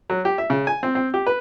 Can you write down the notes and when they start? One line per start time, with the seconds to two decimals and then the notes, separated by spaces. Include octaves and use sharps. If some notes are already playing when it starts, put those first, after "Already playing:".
0.10 F#3
0.25 G4
0.38 E5
0.50 C#3
0.67 G#5
0.83 C4
0.95 C4
1.14 G4
1.27 B4